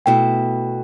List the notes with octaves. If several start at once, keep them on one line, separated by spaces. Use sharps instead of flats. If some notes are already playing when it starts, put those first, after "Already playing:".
B2 A3 E4 G5